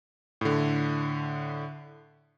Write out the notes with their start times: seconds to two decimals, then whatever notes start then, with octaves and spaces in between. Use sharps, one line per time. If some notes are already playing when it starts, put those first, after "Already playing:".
0.41 A2 D3